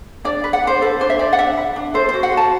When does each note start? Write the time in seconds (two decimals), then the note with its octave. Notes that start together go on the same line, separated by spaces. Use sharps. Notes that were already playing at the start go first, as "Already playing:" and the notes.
0.25 D4 D5
0.44 B4
0.53 F#5
0.63 D4 C5
0.82 A4 B4
1.00 D4 C5
1.10 E5
1.19 D4 D5
1.33 F#5
1.38 D4 E5
1.57 B4
1.76 D4
1.94 A4 C5
2.09 C5
2.14 F#4
2.23 F#5
2.32 F#4
2.37 A5